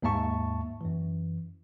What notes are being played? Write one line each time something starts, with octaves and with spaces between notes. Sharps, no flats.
D#2 G#2 A#3 E5 A5 C#6
F#2 E3